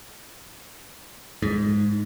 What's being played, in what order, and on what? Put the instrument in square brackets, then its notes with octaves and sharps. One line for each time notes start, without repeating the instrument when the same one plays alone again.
[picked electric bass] G#2